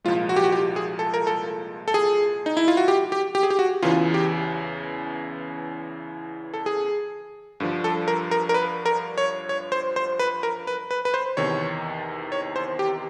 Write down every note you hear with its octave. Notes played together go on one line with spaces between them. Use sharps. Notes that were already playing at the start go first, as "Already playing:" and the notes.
C2 A#2 F3 G#3 F4
F#4
G4
F#4
G4
G#4
A4
A#4
A4
A4
G#4
D#4
E4
F4
F#4
G4
G4
G4
G#4
G4
F#4
E2 C#3 E3 F4
G4
A4
G#4
G2 D3 F3
A4
A#4
A#4
A#4
B4
A#4
C#5
C#5
C5
C5
B4
A#4
B4
B4
B4
C5
E2 C3 D#3 C#5
C#5
C5
G4